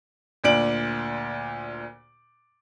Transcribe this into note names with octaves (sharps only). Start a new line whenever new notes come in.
D2 A#2 D4 D7 F#7